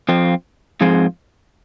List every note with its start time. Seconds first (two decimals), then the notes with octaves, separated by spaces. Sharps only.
0.09 F2 F3 C4
0.81 G#2 F3 C4 G#4 C5